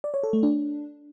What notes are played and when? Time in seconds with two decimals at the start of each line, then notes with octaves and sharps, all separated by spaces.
0.04 D5
0.14 C#5
0.23 A4
0.33 A3
0.43 D4